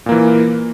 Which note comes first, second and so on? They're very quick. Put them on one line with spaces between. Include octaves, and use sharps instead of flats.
A#2 A#3 E3